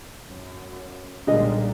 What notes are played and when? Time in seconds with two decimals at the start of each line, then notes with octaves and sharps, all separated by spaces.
0.25 F#2
1.27 B1 A#2 D3 G3 G#3 D#5